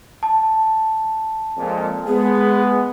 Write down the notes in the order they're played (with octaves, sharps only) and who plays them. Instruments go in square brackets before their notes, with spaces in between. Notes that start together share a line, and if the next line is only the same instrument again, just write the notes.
[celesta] A5
[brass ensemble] F2 A#2 G#3
[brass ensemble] G#3 B3 [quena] G#4